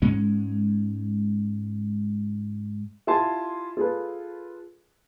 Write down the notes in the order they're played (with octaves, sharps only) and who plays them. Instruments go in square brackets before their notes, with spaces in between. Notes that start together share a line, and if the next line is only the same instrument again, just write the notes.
[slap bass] G#2 G#3 C#4
[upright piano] E4 F4 G4 G#5 A5 C6
F4 G#4 A4 B4